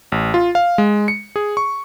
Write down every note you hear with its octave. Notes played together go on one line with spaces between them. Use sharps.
A1
F4
F5
G#3
C#7
G#4
C#6